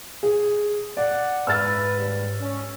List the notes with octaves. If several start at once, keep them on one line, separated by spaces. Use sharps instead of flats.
G#4
D5 F#5
G#2 B4 E6 F6 A6
D#2 G3
C#4